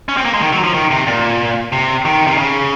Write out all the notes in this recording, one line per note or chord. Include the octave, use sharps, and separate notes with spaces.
C#4
C4
A#3
G#3
D#3
F#3
F3
D#3
C3
A#2
C3
D#3
C3
C#3